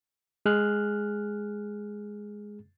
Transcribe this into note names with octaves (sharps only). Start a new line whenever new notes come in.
G#3 G#4 F6 F#6